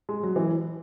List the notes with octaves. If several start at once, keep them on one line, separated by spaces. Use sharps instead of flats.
G#3
F#3
E3